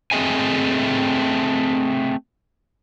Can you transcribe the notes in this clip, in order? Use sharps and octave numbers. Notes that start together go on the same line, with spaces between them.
A3 C4 G#4 D#5 E5 G#5